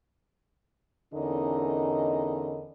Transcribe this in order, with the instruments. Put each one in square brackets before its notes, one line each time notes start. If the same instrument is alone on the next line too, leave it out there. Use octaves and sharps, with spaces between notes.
[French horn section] E2 D3 C#4 D#4 A#4 D#5